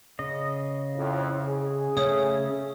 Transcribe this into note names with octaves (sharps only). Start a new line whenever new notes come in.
C#3 D#5
F2 A2
G#4
C#3 A3 C#4 C#5 D#6